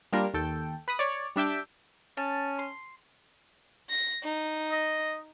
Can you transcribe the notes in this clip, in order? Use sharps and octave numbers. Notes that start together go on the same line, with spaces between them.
G3 A#3 D4 F4 A#4
D#2 A4 G5
B4 B5 D#6
C#5 D5
G3 D4 E5 G5 D6
C#4 A5
C6
A#6
D#4
D#5